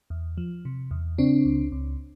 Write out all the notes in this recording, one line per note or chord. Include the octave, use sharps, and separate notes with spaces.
E2
F3
C3
E2
C#3 C4 D4
C#2
C#2